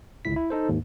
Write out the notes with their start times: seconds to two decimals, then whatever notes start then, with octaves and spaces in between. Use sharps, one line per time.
0.25 G1 C#2 E4 B6
0.36 E4
0.50 D#4 A4 C5
0.69 D#2 G#2